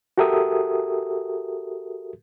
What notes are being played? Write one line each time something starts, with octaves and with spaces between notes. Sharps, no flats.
F#4 G4 A4 A#4 E5 D#6